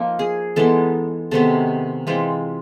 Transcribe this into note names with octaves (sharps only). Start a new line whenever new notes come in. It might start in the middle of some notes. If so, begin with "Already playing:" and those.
Already playing: F3 A#3 D#4 A#4
G#4
E3 G#3 B3 D#4 A4
C3 D#3 G#3 B3 A4
E3 G#3 C4 F4